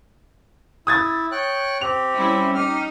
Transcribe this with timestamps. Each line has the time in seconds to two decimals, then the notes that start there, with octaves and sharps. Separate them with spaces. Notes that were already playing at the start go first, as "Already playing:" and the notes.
0.87 E4 D#6 G#6 A6
1.32 C#5 G5 F#6
1.81 C4 G4 F7
2.15 G3 C#4 E4
2.54 D#4 G4 F6